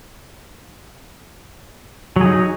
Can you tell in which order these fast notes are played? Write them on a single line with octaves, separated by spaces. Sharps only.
F#3 G#4 D#4